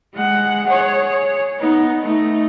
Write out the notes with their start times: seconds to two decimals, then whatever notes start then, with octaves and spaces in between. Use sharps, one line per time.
0.14 G#3 F#5
0.67 G#4 C#5
1.59 B3 D#4
2.01 A3 D#4